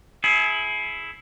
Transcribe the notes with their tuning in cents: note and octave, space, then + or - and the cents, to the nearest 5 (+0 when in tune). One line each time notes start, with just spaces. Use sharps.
E4 +0 G#4 +30